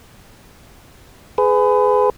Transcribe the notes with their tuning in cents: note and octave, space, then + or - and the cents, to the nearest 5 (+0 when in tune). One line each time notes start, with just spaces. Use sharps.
G#4 +10 B4 +30